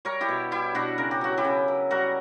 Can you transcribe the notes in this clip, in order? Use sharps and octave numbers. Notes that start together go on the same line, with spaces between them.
G3 A#4 C#5
E4 G4
B2
G3 E4 G4
B2 D4 F#4
C#3 A#4
G4
F#3 F#4
E4 G4
C#3
F#3
G3 F#4 A#4